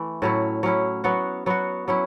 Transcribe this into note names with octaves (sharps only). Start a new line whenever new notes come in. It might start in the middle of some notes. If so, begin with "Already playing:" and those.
Already playing: E3 A3
A2 F#3 C#4 E4
F#3 C#4 E4
F#3 B3 F#4
F#3 B3 F#4
F#3 C#4 E4